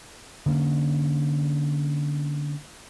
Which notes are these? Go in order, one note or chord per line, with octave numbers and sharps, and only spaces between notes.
D3 A#3 C#4